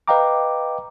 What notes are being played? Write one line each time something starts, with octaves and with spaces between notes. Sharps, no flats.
B4 D#5 F5 G5 A#5 D6